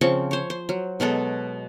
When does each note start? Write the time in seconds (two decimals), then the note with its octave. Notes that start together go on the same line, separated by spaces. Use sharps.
0.01 C#3 F3 C4 C#6
0.31 C5 C#5
0.50 C5
0.69 F#3
1.00 B2 F#3 G#3 A4